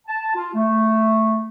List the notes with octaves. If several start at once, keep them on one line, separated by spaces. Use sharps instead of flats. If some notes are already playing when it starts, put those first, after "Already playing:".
A5
F4
A3